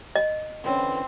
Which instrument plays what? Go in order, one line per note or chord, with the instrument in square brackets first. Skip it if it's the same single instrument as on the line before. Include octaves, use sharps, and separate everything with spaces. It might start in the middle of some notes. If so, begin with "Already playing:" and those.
[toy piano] D#5
[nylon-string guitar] D3 E3 C#4 [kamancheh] C4